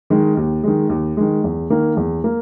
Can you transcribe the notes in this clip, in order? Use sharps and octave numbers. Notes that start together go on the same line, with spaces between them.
D#3 G#3
D#2
D#3 G#3
D#2
D#3 G#3
E2
D#3 A#3
E2
A#3